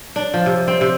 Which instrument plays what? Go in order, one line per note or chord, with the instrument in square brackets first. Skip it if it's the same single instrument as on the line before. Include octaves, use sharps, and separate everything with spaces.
[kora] D4
F3
C3
C4
C3